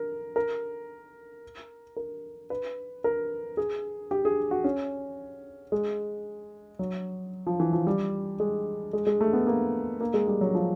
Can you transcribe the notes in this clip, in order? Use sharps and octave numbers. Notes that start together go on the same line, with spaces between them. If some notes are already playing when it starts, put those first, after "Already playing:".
Already playing: A#4
A#4
A#4
B4
A#4
G#4
G4
G#4
F#4
C#4
G#3
F#3
F3
E3
F3
G3
G#3
G#3
G#3
A3
B3
A#3
A#3
G#3
G3
F#3
F3